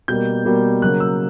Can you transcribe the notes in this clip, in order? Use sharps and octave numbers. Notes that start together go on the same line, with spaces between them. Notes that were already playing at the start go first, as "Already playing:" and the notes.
B2 G3 A#3 G6
B2 G3 A#3
C#3 F#3 A#3 F#6
E6